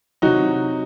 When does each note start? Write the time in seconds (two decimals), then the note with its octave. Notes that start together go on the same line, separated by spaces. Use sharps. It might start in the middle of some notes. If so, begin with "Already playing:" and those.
0.22 C3 F#3 D#4 F#4